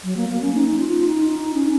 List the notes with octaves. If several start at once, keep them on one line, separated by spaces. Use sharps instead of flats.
F#3
A#3
A#3
C#4
D#4
F4
D#4
D#4
C#4